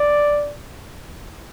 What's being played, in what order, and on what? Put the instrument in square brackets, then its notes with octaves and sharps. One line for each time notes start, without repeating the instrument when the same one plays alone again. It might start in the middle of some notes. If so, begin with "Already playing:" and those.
Already playing: [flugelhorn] D5